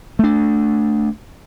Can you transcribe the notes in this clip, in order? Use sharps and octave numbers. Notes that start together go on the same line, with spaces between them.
A3 D4